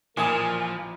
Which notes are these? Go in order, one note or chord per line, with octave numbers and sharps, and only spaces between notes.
A1 A#2 F3 A#3 A#4 G#5 D#6